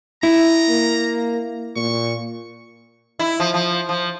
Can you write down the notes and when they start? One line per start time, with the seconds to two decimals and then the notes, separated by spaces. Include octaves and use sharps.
0.23 E4 A#5
0.69 A#3
1.76 A#2 C#6
3.19 E4
3.40 F3
3.54 F3
3.89 F3